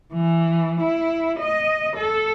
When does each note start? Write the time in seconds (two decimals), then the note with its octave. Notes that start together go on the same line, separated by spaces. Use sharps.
0.13 E3
0.81 E4
1.40 D#5
1.96 A4